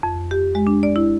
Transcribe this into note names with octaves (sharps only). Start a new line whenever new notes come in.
F2
G4
G#3
D4
D5
E4